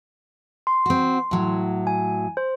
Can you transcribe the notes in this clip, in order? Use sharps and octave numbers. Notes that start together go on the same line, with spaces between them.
C6
C4 F#4
A2 F#3
G#5
C5